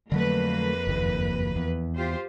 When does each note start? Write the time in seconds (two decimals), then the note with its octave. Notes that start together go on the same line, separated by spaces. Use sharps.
0.12 F2 D3 F#3 A3 A#3 B4
0.87 F#1 D#2
1.56 E2
1.96 F4 G4 C5